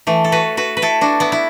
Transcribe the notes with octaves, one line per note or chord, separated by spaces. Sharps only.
E3 A3
A4
F#4 B4
F#4 B4
B4
E4 A4
D4 F#4
B3 E4
E4